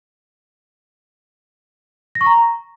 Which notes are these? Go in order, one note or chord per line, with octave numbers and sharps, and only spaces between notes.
A#6
C#6
A#5